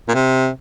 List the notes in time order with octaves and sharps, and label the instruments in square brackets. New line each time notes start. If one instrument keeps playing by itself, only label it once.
[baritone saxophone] A#2
C3